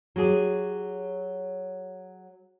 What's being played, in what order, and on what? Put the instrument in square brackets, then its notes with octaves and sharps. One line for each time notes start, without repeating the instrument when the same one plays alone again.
[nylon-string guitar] F#3 G4 G#4